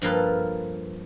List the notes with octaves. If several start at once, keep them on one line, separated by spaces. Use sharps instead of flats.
G2 F3 A#3 A4 B4